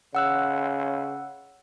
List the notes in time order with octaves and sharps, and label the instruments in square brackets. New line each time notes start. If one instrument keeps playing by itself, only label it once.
[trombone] C#3 [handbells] F#5 E6 F#6